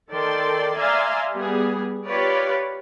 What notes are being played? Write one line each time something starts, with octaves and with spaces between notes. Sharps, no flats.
D#3 A4 D5 G5 C6
D5 E5 F5 G#5 A#5 C6
G3 B3 G#4
F4 G4 B4 C#5 D5